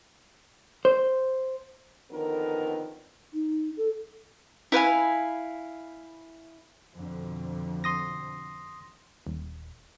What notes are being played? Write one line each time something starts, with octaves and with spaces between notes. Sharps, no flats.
C5
F2 D3 D#3 B3 A#4
D#4
A4
E4 B4 F5 G#5
F2 B2 D3
C6 D#6 A#6
D#1